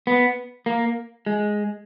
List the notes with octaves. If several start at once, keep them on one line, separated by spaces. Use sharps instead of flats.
B3
A#3
G#3